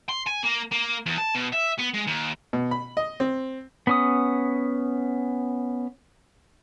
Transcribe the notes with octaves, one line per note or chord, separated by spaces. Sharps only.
C6
G#5
A#3
A#3
E2
A5
B2
E5
B3
G#3
D#2
B2
B5
D#5
C4
B3 C#4 D#6